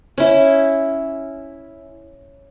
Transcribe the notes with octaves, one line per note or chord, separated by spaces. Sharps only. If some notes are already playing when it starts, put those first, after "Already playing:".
C#4 E4